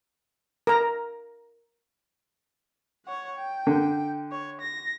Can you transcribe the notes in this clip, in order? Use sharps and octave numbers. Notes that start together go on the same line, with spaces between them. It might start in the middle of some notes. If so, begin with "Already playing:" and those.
A#4 A#5
C#5 F#5
G5
D3
C#5
A#6